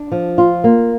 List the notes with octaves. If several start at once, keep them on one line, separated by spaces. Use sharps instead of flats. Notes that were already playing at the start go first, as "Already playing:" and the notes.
Already playing: D4
F3
F4
A#3